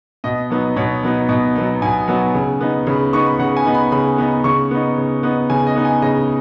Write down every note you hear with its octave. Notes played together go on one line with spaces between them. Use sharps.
B2 D#5
F#3 B3 D#4
B2 C#5
F#3 B3 D#4
B2 D#5
F#3 B3 D#4
B2 G#5
F#3 B3 D#4
C#3
B3 D#4
C#3 B5
B3 D#4 C#6
B5
C#3 F#5
G#5
B3 D#4
B5
C#3 B5
B3 D#4
C#3 C#6
B3 D#4
C#3
B3 D#4
C#3 G#5
D#5
B3 D#4
G#5
C#3 D#5